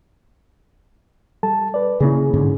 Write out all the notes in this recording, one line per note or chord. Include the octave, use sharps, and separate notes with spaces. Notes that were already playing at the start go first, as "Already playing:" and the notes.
G3 A4 A5
B4 D5
C#3 A#3 E4 G#4
G#2 D3 C#4